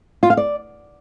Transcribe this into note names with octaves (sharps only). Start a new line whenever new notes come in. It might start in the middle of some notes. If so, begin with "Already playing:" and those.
F4
F5
D5